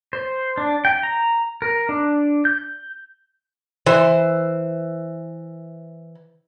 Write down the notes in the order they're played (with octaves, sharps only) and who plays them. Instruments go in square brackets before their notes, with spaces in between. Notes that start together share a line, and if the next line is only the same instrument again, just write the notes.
[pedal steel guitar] C5
D4
G5
A#5
A#4
D4
G6
[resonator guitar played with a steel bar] E3 C5